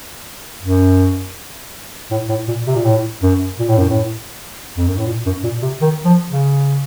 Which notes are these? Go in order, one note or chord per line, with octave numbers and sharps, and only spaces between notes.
F#2
A2
A2
A#2
C3
A#2
A2
F#2
A#2
A2
F#2
A2
F2
F#2
A2
A#2
F#2
A#2
C3
D#3
F3
C#3